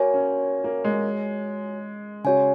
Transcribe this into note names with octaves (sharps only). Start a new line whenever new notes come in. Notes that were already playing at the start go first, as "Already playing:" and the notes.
Already playing: A#3 F#4 C#5 G#5
C#4
A#3
G#3
C#3 F#4 C#5 G#5